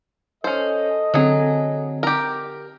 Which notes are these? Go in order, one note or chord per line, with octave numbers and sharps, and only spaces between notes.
C#4 A4 C5 D#5
D3 F#3 C4 G#4
G4 A#4